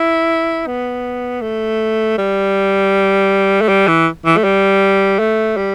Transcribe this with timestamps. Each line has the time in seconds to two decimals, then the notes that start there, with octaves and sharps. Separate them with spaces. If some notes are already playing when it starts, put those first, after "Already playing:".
Already playing: E4
0.67 B3
1.42 A3
2.18 G3
3.62 A3
3.68 G3
3.87 E3
4.25 E3
4.37 A3
4.44 G3
5.19 A3
5.57 G3